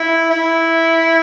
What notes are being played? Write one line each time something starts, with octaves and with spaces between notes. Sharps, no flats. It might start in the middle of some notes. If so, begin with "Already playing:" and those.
Already playing: E4
E4